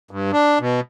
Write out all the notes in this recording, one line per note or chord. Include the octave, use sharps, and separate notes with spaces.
G2
D4
B2